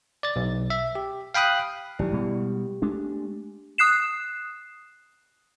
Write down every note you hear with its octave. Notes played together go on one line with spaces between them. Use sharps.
D5 A6
B1
E5
G4
F5 G5 B5 D#6 F#6
G#1 D#3 F#3 E4 G4 D5
B2 G3 G#3 B3 G4
G#3 A3 D4
D#6 F#6 C7 E7